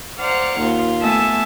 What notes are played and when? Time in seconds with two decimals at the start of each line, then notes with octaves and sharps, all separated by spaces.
0.20 C5 D5 F5 F#5 A#5
0.60 D#2 F4
1.00 A3 B3 E5 G#5 A5